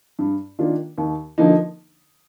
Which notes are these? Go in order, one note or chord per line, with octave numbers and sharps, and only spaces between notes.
G2
D#3 A#3 D4 F4
D#2
D3 F3 A#3 D#4